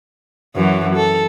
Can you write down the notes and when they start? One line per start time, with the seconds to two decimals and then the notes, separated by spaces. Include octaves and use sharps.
0.56 F#2 E3 F#3
0.96 A4